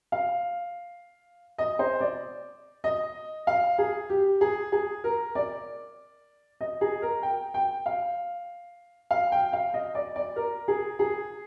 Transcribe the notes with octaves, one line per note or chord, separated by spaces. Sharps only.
F5
D#5
C5
D5
D#5
F5
G#4
G4
G#4
G#4
A#4
D5
D#5
G#4
A#4
G5
G5
F5
F5
G5
F5
D#5
D5
D5
A#4
G#4
G#4